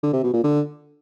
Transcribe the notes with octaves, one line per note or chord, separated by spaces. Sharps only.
D3
C3
B2
A#2
D3